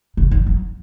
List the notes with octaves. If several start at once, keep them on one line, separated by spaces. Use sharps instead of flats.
C#3
D#3
F#3